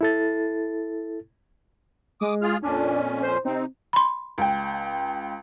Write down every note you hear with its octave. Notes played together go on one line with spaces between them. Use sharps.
E4 A4 A6
G#3 D6 D#6
F4 G#4 F6
F2 A#2 C#4 D4
C5
C3 C4 D#4
B5 C6
C#2 G5